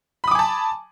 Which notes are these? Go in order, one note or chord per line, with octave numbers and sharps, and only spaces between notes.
G#5 A5 B5 D6 D#6